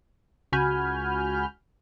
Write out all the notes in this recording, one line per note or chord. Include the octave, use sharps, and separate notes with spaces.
C#2 F#4 G#5 B5 F6 G6